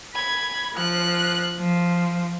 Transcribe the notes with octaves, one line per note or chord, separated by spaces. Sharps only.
B5 G#6
F3 F#6
F3